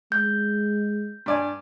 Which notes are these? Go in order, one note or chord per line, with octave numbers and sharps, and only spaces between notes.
G#3 G6
G2 D5 G#5